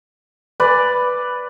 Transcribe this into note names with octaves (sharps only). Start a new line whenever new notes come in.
B4 D5